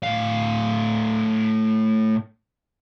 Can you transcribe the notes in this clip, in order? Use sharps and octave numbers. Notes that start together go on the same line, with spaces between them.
A2 F5